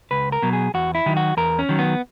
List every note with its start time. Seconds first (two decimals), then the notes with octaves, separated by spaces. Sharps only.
0.11 C#2 B4
0.32 A#4
0.42 B2 F#3
0.53 G#4
0.74 E2 F#4
0.95 E4
1.06 D#3 F#3
1.17 F#4
1.37 E2 A#4
1.59 C#4
1.69 D#3 F#3
1.79 B3